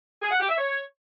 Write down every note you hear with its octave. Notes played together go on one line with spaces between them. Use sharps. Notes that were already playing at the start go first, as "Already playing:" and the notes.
G#4
F#5
G4
E5
C#5